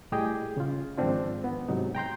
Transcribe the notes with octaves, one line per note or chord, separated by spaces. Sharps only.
A2 G3 G4 G#4 D#5 G5
C#3 F4
G#2 D#3 F3 C4 D4 F4
B3
G#2 C3 F#3 D#4
G5 A#5 C6 G6